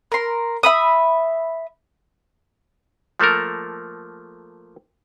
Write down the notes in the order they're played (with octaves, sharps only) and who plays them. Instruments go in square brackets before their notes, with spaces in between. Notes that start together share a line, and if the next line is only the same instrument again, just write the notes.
[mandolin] A#4 C6
E5 B5 D#6
[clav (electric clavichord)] F3 A3 A#3 A4 A#4